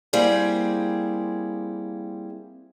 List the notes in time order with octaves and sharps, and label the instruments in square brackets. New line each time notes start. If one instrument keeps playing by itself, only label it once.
[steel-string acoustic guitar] G3 A#3 C4 E4 G#4